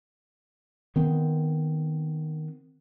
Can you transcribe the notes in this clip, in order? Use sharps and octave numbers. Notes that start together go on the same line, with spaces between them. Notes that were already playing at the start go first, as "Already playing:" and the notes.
D#3 B3 C4